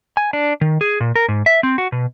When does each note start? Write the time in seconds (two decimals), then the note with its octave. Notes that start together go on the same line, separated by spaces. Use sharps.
0.17 G#5
0.33 D4
0.61 D#3
0.81 G#4
1.00 A#2
1.16 A#4
1.28 G#2
1.46 E5
1.63 C4
1.78 F#4
1.92 B2